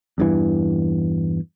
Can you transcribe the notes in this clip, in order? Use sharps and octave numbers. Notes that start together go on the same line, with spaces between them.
E2 G2 E3